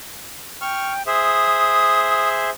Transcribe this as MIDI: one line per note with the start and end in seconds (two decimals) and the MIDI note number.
0.61 1.03 79
0.61 0.92 85
0.61 0.92 89
1.07 2.50 68
1.07 2.50 72
1.07 2.50 76
1.07 2.29 87